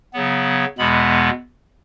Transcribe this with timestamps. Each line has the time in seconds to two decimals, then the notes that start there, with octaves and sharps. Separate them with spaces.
0.13 C#3 F#3 B3
0.78 E2 B2 G#3 B3 B5